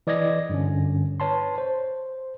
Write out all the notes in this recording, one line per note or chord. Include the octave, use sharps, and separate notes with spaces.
E3 D5 D#5 G#6 A#6
G2 D3 C#4
B4 C#5 A5 C6
C5